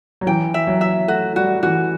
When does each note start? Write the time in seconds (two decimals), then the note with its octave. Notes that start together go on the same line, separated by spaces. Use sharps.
0.21 F#3
0.27 E3 G5
0.54 E5
0.67 F#3
0.81 E5
1.08 A3 F#4
1.36 G3 F#4
1.63 E3 F#4